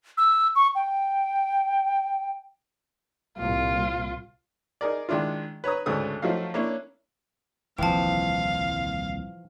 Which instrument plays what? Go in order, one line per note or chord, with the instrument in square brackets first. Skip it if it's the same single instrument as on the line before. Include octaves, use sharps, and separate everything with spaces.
[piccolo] E6
C#6
G5
[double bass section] C2 A#2 [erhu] F4
[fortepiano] D#4 G#4 A#4 D5
D#3 G#3 D4 E4 F4
B4 C#5 A#5 D#6
D2 G#2 C#3 A3 A4 D#6
F3 F#3 A3 D#4 F5
A#3 C#4 D4 E4 C#5
[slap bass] D#1 C2 [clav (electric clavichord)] E3 F3 [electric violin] F5 [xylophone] G5 A5